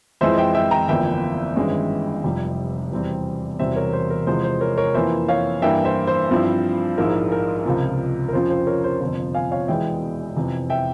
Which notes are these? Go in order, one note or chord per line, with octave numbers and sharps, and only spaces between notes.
F2 E3 G#3 E4 C5 E5
E5 G5
E5 G5
G5 A#5
G1 F2 E3 A#3 E5 G5
G#1 G2 E3 G#3 C#4
F1 F2 C3 G3
E1 E2 C3 G3 C4
E1 E2 C3 G3 C4 C5 E5
A#4 C#5
C5
A#4
E2 C3 F3 G#3 C5
C5
A#4 C#5
A#4 C#5
F2 E3 A#3 E4 C5 E5
C#5 F5
G2 E3 A#3 E4 E5 G5
C5 E5
C5
G2 F3 C4 E4
A#1 G#2 F3 G#3 E4 A#4
A#4
C#2 C3 F3
A#4
F2 C#3 F3 C4 C5
C5
A#4 C#5
C5
G1 F2 C3 F3 C5
F5 G#5
C#5 F5
E1 E2 E3 G#3 E5 G5
F2 C3 E3
E5 G5